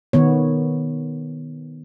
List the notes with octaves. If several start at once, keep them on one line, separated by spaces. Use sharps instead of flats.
D#3 B3 C#5